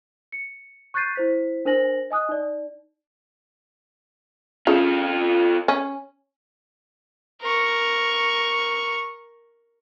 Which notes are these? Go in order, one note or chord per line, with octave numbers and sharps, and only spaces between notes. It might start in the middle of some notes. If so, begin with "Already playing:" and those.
C#7
C#6 F#6 G6 A6 C7 D#7
E4 C5 B6
D4 A#4 C5 G#5 A#6 F#7
D#5 G#5 D#6 F#6
D#4 D5
C#3 F4 A4
C#4
A#4 C#6